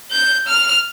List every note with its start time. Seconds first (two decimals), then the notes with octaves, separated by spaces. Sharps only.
0.12 G6
0.47 F6